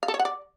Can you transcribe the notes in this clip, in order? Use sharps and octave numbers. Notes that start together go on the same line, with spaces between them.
F5
A4
C#5
F#5
D5